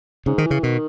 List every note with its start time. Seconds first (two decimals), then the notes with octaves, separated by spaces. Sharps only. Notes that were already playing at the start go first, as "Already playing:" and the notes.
0.26 G#2 C#3
0.38 D#3
0.45 E3
0.51 C#3
0.63 B2 D#3